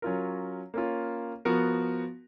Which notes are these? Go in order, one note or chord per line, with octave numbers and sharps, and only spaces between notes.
F#3 C#4 F4 A#4
A#3 C#4 F4
F3 B3 F#4 A#4